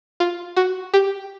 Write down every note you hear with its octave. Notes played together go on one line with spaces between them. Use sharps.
F4
F#4
G4